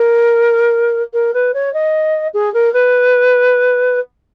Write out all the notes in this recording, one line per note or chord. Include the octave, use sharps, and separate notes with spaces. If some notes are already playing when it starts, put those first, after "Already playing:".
Already playing: A#4
A#4
B4
C#5
D#5
G#4
A#4
B4